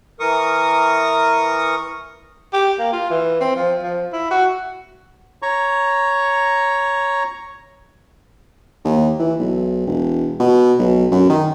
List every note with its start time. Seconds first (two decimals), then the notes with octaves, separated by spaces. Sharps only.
0.20 E3 A#4 C#6 D#6
2.53 G4
2.79 A#3
2.93 F4
3.10 E3
3.41 C4
3.56 F3
3.83 F3
4.13 E4
4.31 F#4
5.42 C#5 A#5 C#6
8.84 D#2
9.19 E3
9.39 B1
9.87 E1
10.40 B2
10.79 B1
11.11 F#2
11.30 D#3